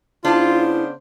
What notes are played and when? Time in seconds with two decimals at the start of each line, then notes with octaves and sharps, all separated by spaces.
0.25 C#3 B3 D4 E4 F4 C5 A5